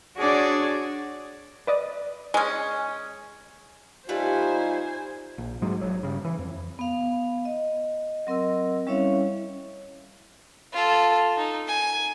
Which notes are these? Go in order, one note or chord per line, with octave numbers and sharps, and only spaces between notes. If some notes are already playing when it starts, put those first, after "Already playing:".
D4 F#4 G#4 C#5 D5
B4 D5 D#5
G#3 C#4
G3 A3 D#4 F4 B4 C5 G#5
A#1
G#2 F#3 G#3
G#1 F#3
G2 C#3
E3
F2
B3 F5
D#5
F#3 C4 A#4 D#5 E6
G3 C#4 E4 C#5 E5 F5
F4 A4
D#4
G#5